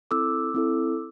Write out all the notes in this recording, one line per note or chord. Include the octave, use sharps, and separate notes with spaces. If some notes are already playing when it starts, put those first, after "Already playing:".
C4 E4 A4 D6 E6
C4 E4 A4